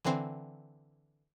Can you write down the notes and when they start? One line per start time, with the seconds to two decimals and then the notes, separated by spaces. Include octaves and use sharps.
0.05 D3 E3 C4